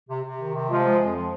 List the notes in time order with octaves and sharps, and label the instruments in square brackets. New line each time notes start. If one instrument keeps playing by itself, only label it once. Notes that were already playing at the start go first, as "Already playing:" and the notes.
[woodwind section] C3
C3
D#3
C3
[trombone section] F3 [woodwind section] G#3
[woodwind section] G#3
F2
F3